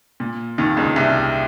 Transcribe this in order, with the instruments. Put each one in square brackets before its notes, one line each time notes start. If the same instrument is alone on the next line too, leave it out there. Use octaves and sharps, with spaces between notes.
[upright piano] A#2
D#2 D#3
C#2 C#3
C2 C3